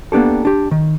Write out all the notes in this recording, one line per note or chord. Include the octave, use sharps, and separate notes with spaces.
A#3 B3 D4 G4 A4
D4 G4
D#3